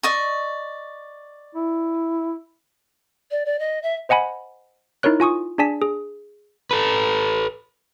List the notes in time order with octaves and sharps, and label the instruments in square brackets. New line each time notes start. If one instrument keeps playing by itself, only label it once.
[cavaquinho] D5 D#5 C#6
[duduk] E4
[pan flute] D5
D5
D#5
E5
[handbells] C5 D#5 F#5 G#5 B5
D#4 E4 A#4 C#5 F#6
F4 G#5 C#6 D#6
D4 G#4 D5 G#5 A5 B6
G#4
[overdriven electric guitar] A4 B4